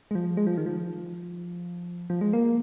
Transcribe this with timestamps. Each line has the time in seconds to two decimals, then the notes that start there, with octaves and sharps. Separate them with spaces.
0.11 G#3
0.15 F3
0.37 G#3
0.47 F3
0.57 D#3
0.66 F3
2.10 F3
2.21 G#3
2.33 A#3